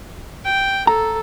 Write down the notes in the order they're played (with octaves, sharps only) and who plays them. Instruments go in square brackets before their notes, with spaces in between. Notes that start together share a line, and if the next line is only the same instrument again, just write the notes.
[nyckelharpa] G5
[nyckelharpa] A4 [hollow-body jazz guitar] A#5